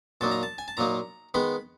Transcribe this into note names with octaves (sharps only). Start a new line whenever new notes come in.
A#2 F#3 A#3 D#4 A5
A#5
A5
G#5
A5
A#2 F#3 A#3 D#4 A#5
D#3 G#3 B3 B5